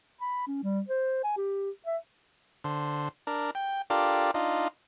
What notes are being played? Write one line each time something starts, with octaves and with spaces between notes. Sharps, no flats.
B5
C#4
G3
C5
G#5
G4
E5
D3 C5
D4 A#4
G5
D4 F4 G4 A4 A#4 D5
D4 D#4 F4